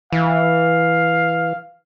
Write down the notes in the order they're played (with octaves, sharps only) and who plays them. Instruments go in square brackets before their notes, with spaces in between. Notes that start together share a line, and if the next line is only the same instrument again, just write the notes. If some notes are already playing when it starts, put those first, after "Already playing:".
[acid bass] E3 [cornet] F5